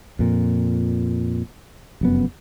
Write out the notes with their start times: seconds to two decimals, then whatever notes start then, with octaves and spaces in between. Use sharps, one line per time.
0.19 F2 A#2
2.01 F1 F#2 B3